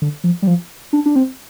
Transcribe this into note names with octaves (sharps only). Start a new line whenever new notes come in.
D3
F3
G3
F3
D4
D4
C4